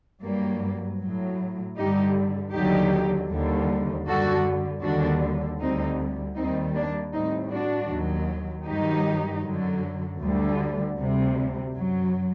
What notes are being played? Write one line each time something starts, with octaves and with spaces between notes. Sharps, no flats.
G2 F#3 G3 A#3
A2 F#3
G2 D3 G3 D#4 G4
D#2 D3 F#3 D#4 G4
D#2 D3 G3
F#2 D3 G3 F#4 A4
D#2 D3 G3 D4 F#4
D2 D3 G3 C4 D#4
D#2 D#3 G3 C4 D#4
A#3 D4
A2 G3 C4 D#4
D4 F#4
D#2 D#3 F#3
G2 D#3 F#3 D#4 G4
F#2 D3 F#3
D2 D3 G3
D2 C3 G3
F#2 F#3